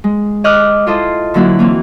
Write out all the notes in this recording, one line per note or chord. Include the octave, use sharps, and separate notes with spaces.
G#3
B4 D#5 D6 F6 F#6
E4 F4 A4 C5 D#5
D3 F#3 A#3 E4 F#5
E3 A#3 C4